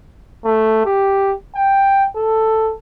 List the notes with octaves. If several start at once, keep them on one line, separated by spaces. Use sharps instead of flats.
A3
G4
G5
A4